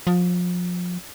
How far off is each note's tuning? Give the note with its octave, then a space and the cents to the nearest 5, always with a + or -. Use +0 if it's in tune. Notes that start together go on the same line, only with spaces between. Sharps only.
F3 +30